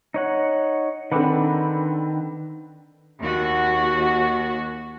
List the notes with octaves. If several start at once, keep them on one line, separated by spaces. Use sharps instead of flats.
D#4 C#5 F#5
D3 D#3 C4 B4 F#5 D6
D#2 F#4